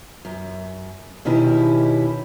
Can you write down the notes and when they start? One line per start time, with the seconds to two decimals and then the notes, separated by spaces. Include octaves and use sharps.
0.25 F#2
1.25 B2 D#3 C#4 E4 G4